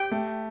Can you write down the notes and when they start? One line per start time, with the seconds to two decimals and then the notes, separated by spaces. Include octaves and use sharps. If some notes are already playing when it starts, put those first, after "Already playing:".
Already playing: G4 G5
0.11 A3